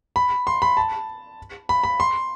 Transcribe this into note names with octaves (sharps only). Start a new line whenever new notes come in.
B5
C6
B5
A5
B5
B5
C6